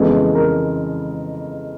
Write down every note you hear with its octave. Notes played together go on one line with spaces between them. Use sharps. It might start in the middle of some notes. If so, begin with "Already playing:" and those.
Already playing: F2 C#3 E3 G#3 B3 A4
A#4